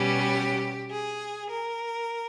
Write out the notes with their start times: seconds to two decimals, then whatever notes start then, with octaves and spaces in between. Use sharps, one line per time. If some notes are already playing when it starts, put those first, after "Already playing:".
Already playing: B2 G3 C#4 G4
0.91 G#4
1.49 A#4